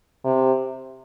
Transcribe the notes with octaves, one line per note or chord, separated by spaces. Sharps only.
C3